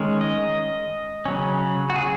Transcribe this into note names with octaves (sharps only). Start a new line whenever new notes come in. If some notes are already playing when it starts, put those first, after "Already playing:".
Already playing: D#3 G#3 C#4
D#5
C#3 F#3 C#4
F#4
G#4